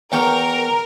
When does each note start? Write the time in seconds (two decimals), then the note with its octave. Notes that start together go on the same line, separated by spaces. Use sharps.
0.12 E2 A#4 G5 C#6